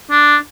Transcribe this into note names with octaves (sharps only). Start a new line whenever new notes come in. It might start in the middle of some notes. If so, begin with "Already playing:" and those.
D4